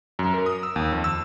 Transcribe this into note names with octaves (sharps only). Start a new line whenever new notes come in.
F#2
A#4
D#6
E6
D#2
F2
E6